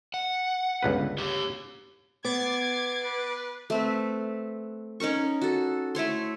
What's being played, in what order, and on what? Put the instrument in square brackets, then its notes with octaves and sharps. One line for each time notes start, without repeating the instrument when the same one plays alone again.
[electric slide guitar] F#5
[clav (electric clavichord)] G1 C#2 B4
[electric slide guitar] G4 C#5
[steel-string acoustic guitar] B3 [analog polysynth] D6 A6 C7 [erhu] G#6
[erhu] B4
[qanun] A3 C4 B4
C#4 D#4 A#4 C#6
F#4 A4
A3 E4 C#5 C6